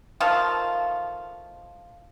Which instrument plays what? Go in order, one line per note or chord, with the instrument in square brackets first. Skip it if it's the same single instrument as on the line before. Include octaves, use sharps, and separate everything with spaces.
[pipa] D#3 F3 A3 F4